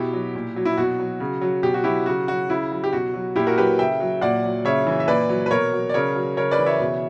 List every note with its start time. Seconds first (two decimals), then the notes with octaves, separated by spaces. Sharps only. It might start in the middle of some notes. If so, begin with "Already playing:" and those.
Already playing: B2 E4 G4
0.13 F#3
0.35 A#2
0.56 F#3
0.65 E4
0.77 B2 F#4
1.00 F#3
1.20 C#3
1.41 F#3
1.63 B2 G4
1.74 F#4
1.84 F#3 E4 G4
2.06 C#3 F#4
2.28 F#3 F#4
2.50 C#3 E4
2.72 F#3
2.84 G4
2.93 B2 F#4
3.14 F#3
3.36 A#2 E4 G4
3.47 F#4 A#4
3.58 F#3 G4 B4
3.79 C#3 E5 G5
4.00 F#3
4.21 A#2 D5 F#5
4.44 F#3
4.65 C#3 C#5 E5
4.87 E3
5.00 E5
5.08 A#2 B4 D5
5.29 F#3
5.46 B4
5.51 B2 A#4 C#5
5.73 F#3
5.89 D5
5.94 C#3 A#4 C#5
6.16 F#3
6.37 C#3 A#4 C#5
6.51 B4 D5
6.59 E3
6.66 C#5 E5
6.80 B2